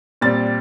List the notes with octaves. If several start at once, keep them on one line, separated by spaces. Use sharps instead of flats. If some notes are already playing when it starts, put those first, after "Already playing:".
A#2 G3 C4 A6